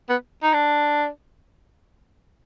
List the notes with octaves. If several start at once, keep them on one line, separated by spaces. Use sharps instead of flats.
B3
D#4
D4